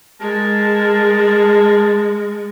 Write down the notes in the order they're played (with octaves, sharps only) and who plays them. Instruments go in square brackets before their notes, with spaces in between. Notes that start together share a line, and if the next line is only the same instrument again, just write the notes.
[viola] G#3 [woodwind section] G#4 A#4 A5